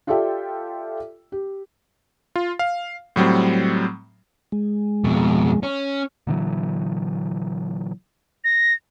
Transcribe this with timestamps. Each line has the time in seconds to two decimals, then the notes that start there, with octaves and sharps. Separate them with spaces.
0.07 F4 G4 A4 D5 E5 G5
1.32 G4
2.36 F4
2.59 F5
3.16 A2 F#3 G3 C4
4.52 G#3
5.04 F2 B2
5.63 C#4
6.27 A#2 D3 E3 F#3
8.44 A#6